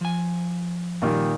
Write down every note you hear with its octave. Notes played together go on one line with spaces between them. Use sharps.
F3 G#5
A#2 D#3 G3